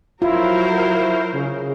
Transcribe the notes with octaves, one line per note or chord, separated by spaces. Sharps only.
F#3 E4 F4 A#4 C5
C#3